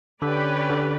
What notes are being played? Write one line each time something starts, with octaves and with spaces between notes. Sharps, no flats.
D3 C#4 G4 B4 D5
D3